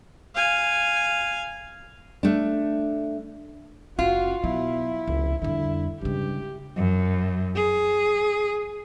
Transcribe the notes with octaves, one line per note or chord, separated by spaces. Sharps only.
F5 G#5
A3 D4
F#1 C#4 F4 F#4
B2 F#3 E4
F1 C#2
F2 D3 G3 E4
G2 C#3 G#3 G4
F#2
G#4